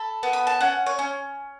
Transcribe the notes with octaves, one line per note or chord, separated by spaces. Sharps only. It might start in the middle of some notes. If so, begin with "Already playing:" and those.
Already playing: A4 B5
B3
B5
A5
C#4 F#5
C#5
C#4